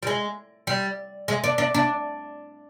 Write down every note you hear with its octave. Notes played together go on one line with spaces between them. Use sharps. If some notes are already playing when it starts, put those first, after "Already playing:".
G3
G#3
G3
G#3
D4
D4
D4